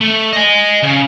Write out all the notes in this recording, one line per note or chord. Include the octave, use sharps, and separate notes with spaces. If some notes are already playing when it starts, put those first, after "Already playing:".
A3
D#5 G#5
C#3